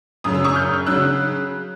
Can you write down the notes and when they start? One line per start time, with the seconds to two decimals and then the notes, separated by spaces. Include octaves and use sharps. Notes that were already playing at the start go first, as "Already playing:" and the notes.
0.24 F#2 C#3 F#3 D#6
0.34 E6
0.44 C#6 D#6
0.55 F6 G6
0.86 C#3 F#3 E6 F#6